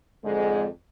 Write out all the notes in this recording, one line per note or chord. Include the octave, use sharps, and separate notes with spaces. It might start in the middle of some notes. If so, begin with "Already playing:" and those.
F2 G#2 D3 G#3